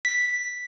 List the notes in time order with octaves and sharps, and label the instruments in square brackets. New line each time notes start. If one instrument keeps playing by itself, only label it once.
[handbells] B6